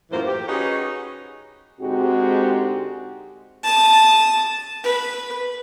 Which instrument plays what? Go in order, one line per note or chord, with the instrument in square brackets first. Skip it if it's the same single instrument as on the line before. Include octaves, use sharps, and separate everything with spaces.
[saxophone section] F#2 A2 E3 A#3 F4 C5
G4
C#4 D#4 F#4 G#4 B4 D#5
[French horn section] G#2 D3 G#3 C4 F#4 G4
[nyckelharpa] A5 D#6
B4